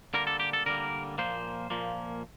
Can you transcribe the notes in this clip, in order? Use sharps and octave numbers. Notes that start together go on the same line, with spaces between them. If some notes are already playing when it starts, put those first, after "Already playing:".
D3 G3 A#3 A#4
A4
G4
A4
D3 G3 A#3 A#4
A#2 F3 A#3 C5
A#2 F3 A#3